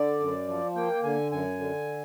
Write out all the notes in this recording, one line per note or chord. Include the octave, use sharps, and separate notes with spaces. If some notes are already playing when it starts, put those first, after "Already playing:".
Already playing: D3 D5
F#2
F3
A#3 G5
D3 G#5
F#2 G#5
D3